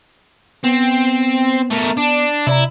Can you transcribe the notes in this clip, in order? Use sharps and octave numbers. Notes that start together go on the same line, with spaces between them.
B3 C4
A3 A#4
D4
C3 E4 D5 A#5